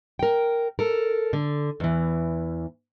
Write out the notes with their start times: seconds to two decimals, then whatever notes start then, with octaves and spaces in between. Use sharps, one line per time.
0.19 A#4 G5
0.79 A4 A#4
1.33 D3
1.80 E2 E3